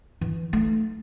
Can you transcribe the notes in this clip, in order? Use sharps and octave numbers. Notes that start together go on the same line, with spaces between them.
E3
A3 D#4